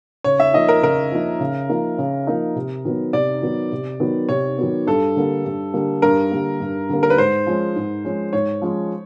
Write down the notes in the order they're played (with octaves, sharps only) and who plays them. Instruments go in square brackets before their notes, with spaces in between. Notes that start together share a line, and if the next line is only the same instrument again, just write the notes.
[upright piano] C#3 [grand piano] C#5
[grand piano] E5
[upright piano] F3 A#3 D#4 [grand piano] D#5
[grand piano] A#4
[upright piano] C#3 [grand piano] A#4
[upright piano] F3 A#3 D#4
C#3
F3 A#3 D#4
C#3
F3 A#3 D#4
C3
D#3 F#3 B3
[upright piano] C3 [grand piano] D5
[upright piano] D#3 F#3 B3
C3
D#3 F#3 B3
[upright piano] C3 [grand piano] C#5
[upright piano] D#3 F#3 B3
[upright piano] G2 [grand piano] A4
[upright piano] D3 G3 A#3
G2
D3 G3 A#3
[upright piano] G2 [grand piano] A#4
[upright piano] D3 G3 A#3
G2
D3 G3 A#3
[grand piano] A#4
B4
[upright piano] G#2 [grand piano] C5
[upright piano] F3 G#3 C#4
G#2
F3 G#3 C#4
[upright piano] G#2 [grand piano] C#5
[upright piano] F3 G#3 C#4